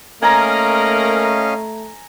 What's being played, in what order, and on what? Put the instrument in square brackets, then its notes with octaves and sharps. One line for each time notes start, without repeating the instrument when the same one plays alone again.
[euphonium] A3 [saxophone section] A#3 A#4 [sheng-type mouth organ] C#4 D#5 F5 [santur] G#5 A#5